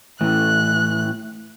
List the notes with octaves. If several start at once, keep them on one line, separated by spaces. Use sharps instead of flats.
A2 E3 F#6